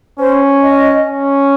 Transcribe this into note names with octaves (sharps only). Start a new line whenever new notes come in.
C#4 C5
D#5
C#4